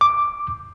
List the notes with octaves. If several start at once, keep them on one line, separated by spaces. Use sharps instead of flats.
D6